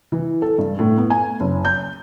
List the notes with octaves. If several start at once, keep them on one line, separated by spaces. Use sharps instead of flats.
E3
A4
G2
A2
B3
G#5
F#1
G6